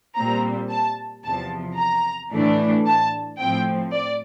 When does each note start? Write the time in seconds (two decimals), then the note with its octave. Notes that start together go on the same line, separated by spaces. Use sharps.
0.17 A#2 G3 C4 A#5
0.71 A5
1.26 E2 C3 F3 A5
1.79 A#5
2.32 A2 E3 A3 D4
2.87 A5
3.40 A2 F3 C4 G5
3.94 D5